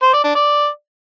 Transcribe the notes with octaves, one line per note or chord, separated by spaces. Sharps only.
C5
D5
D4
D5